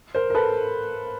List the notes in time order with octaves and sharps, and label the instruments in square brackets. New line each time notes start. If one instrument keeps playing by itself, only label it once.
[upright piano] A#4 C5
A#4
A4 B4